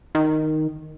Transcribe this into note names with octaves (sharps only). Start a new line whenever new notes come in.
D#3